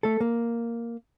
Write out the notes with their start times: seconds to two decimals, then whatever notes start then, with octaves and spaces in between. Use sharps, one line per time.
0.03 A3 A4
0.21 A#3